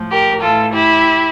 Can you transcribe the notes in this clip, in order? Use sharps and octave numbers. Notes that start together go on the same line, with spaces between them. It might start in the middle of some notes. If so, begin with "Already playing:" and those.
Already playing: A2 F3
G4 A#4
A2 E3 F4 A4
E4 G4